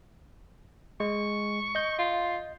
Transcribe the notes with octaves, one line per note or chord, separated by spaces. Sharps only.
G#3 C#6
D#5 G6
F4